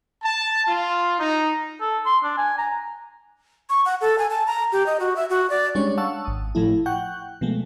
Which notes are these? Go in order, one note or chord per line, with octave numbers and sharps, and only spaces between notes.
A5
F4
D#4
A4
C6
D4
G#5
A#5
C#6
F#5
A4
G#5
A5
A#5
G4
D#5
F#4
E5
F#4
D5
G3 G#3 C#4 D4 C#5
F5 F#5 A5 C#6 E6
G#1 D#6
A2 F3 A3 E4
F#5 G5 C#6 F#6 G6
B2 F3 G#3 A3